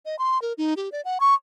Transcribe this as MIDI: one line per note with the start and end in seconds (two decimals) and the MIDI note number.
0.06 0.16 75
0.19 0.41 84
0.42 0.53 70
0.58 0.74 63
0.77 0.89 67
0.92 1.01 74
1.05 1.18 78
1.20 1.34 85